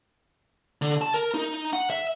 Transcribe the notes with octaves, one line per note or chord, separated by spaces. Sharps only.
D3
A5
A#4
D#4
F#5
E5